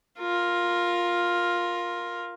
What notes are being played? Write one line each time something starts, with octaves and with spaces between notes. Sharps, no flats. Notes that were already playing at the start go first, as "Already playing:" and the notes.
F4 A#4